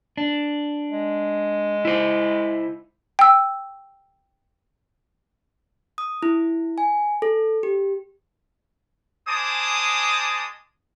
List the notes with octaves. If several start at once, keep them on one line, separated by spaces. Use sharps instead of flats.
D4
G#3
E4 C5
G5 E6
D#6
E4
G#5
A4
G4
G#3 C5 G#5 A5 D6 D#6